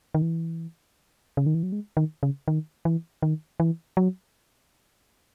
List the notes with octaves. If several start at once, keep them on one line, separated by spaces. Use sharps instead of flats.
D#3
E3
C#3
D#3
E3
F#3
G#3
D#3
C#3
D#3
E3
D#3
E3
F#3